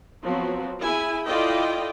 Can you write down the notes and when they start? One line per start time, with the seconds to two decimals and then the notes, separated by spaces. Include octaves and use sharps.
0.24 F3 F#3 B3 C4 F#4
0.80 E4 G#4 G#5
1.26 E4 F4 A4 D5 D#5 G5